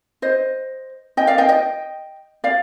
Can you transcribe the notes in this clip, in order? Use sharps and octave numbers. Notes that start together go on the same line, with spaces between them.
C5 D#5
D#5 G5
D5 F5
D#5 G5
D#5 G5
D5 F5